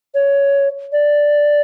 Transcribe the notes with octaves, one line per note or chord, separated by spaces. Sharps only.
C#5
D5